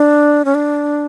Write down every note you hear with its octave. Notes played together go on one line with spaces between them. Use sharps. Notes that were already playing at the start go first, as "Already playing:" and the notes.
Already playing: D4
C#4
D4